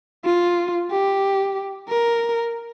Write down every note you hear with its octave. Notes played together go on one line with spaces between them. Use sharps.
F4
G4
A#4